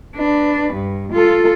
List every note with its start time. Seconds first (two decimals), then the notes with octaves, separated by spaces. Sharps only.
0.17 D4 B4
0.74 G2
1.13 F4 A4